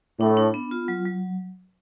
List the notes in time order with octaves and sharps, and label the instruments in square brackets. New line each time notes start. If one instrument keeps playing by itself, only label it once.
[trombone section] A2 [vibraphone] D4
[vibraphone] D4
B3
F4
F#3
F#3